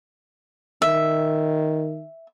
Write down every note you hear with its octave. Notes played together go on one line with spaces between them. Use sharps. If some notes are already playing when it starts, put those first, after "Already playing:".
D#3 E5